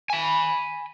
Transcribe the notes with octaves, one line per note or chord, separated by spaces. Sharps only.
G#5 B5